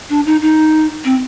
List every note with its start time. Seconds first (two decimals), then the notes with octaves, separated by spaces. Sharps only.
0.10 D4
0.26 D#4
0.42 D#4
1.05 C4